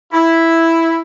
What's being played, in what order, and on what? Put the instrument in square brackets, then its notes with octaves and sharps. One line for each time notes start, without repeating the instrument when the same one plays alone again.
[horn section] E4